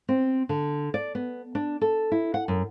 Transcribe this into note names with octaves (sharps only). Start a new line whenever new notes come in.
C4
D3
D5
B3
D4
A4
E4
F#5
F#2